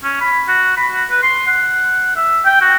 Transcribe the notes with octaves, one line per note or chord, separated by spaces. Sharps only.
C#4
B5
F#4
B5
F#4
B4
C6
F#5
E5
G5
F#4